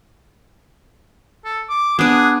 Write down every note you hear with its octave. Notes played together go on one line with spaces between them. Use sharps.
A4
D6
B3 D4 G#4